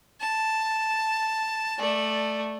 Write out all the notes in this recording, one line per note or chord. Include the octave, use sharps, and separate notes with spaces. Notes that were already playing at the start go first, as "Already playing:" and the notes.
A5
A3 D5